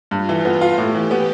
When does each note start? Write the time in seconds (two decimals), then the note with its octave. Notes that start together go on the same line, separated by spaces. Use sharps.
0.11 G2 F4
0.29 E3
0.45 B3
0.61 F4
0.78 A2 G4
0.95 E3
1.11 B3